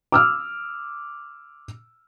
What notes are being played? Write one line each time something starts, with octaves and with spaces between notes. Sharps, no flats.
D6 E6 F6